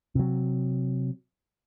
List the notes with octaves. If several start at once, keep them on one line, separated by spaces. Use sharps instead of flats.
C3 F#3